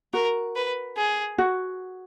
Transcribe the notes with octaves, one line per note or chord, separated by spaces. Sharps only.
F#4 A#4
B4
G#4
F#4